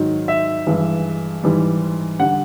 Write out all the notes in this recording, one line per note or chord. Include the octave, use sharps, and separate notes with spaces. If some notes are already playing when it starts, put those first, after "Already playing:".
Already playing: G#2 D#3 F#3
E5
G2 E3 G#3
G#2 E3 G3
D3 G3 F#5